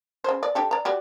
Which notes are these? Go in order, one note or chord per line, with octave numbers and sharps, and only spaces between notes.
C#3 C5
D5
D4 G4 A4
D5 A#5
F#4 G4 D5